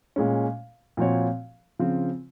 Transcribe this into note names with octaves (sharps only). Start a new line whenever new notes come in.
A#2 G#3 C#4
A#2 F3 C4 F#4 C#5
C#3 F3 C4 F4